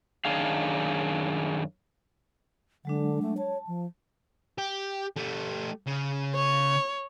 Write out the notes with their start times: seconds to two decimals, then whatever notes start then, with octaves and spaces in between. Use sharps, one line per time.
0.25 F#2 D#3 D4 G#4 F5
2.85 D3 F#3 G#3 D4
3.22 A3
3.38 C#5 A5
3.67 F3
4.58 G4
5.16 A3 G4
5.87 C#3
6.35 C#5